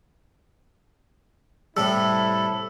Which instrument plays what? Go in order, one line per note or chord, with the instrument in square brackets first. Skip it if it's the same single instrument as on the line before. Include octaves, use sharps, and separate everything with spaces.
[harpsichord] A2 C3 G3 [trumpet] E4 [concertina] A4 [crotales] E6